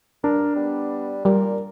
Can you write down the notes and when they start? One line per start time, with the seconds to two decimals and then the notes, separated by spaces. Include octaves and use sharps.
0.24 G2 D4 A#4
0.56 G3 B3
1.25 A#2 G3 A#4